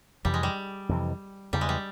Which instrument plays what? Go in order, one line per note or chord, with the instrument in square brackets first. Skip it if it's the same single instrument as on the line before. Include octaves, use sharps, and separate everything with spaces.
[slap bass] F2 C3 E3 [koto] G3
[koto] G#3
G3
[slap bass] F2 C3 E3
[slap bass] E2 C#3 E3 [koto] G3
[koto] G#3
G3